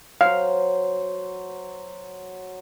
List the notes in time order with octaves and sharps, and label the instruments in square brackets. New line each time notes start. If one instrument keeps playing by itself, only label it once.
[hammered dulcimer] F#3 C5 [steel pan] F5